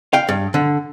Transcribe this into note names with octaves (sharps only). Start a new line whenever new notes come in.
F5 G5
G2
D3